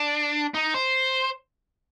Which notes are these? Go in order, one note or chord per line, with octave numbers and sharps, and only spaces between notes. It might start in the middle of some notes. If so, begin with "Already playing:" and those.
Already playing: D4
D#4
C5